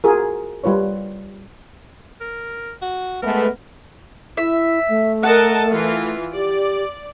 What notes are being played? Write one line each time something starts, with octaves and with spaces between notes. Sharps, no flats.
F4 F#4 G#4 A#4
G3 F4 B4 C#5
A#4
F#4
G#3 A3 B3 A#4
E4 E5
A3
A#4 D#5 F#5 A5
E3 F4
G4 D5